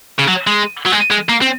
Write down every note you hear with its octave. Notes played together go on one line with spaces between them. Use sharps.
C#3
F#3
G#3
F#3
G#3
G#3
A#3
C4